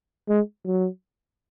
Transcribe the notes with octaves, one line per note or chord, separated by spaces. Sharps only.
G#3
F#3